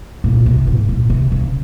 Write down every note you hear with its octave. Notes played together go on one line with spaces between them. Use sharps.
A#2
C3
G#2
A#2
C3
C#3